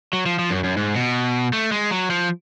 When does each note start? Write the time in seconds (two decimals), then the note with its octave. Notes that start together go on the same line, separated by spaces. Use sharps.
0.13 F#3
0.26 F3
0.39 F3
0.51 F#2
0.64 F#2
0.77 G#2
0.95 B2
1.53 A3
1.72 G#3
1.91 F#3
2.10 F3